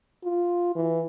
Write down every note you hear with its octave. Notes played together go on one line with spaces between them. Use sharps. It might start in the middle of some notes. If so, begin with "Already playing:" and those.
F4
E3